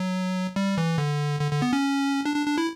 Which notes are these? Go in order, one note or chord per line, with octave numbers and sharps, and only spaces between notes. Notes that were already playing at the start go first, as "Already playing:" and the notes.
Already playing: F#3
G3
E3
D3
D3
D3
B3
C#4
D4
D4
D4
E4